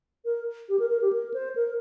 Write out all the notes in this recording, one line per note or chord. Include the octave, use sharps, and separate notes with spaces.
A#4
G4
A#4
A#4
G4
A#4
C5
A#4